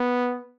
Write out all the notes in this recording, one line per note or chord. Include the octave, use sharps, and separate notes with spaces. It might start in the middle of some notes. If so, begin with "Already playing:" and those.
Already playing: B3